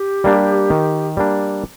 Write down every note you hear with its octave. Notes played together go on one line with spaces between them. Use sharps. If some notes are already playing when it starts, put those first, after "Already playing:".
Already playing: G4
G3 A#3 D4
D#3
G3 A#3 D4